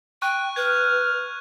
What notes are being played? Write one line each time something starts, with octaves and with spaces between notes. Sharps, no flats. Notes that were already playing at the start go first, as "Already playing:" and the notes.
G5 C#6 F#6
B4 F6 G#6